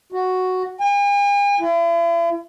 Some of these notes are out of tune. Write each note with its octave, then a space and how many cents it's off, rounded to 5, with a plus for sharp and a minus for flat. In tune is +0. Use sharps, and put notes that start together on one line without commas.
F#4 +0
G#5 -45
E4 +45